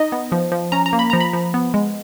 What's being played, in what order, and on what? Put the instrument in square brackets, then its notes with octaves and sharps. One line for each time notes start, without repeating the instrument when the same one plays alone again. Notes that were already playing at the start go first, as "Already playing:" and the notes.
Already playing: [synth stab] D#4 D#5
B3
F3
F3
C#4 A#5
A#5
A#3
B5
F3 A#5
B5
F3
B3
G#3